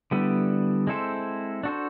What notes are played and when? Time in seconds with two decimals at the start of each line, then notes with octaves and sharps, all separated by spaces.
0.11 D3 G3 B3 E4
0.87 G#3 C4 E4 A4 C5
1.63 D4 F#4 A4 C5